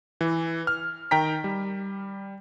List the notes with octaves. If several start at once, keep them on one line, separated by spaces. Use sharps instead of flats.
E3
F6
D#3 G5 A#5 B6
G3